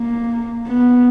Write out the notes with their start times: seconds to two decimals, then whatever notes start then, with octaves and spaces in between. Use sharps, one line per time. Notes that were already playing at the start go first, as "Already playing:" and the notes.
Already playing: A#3
0.68 B3